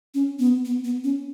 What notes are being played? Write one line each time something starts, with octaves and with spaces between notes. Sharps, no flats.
C#4
B3
B3
B3
C#4